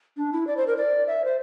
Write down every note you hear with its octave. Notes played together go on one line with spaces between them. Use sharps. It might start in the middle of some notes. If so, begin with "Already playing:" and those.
D4
E4
D5
C5
A#4
D5
E5
C5